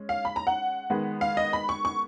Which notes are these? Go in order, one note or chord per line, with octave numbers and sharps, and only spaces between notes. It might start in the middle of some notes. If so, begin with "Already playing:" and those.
Already playing: G#3 C#4
F5
B5
A#5
F#5
D#3 G#3 B3
F5
D#5
B5
C#6
C#6